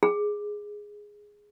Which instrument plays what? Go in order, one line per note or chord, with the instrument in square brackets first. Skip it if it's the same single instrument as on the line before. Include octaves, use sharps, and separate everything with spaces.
[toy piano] G#4